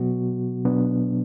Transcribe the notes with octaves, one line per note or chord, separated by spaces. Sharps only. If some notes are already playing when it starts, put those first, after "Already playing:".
Already playing: B2 F#3 B3 F#4
B2 F#3 B3 D4